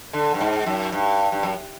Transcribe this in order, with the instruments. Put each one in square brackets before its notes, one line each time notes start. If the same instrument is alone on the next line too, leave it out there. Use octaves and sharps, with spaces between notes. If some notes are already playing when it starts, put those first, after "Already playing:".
[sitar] D3
G2
G#2
F#2
G2
G2
F#2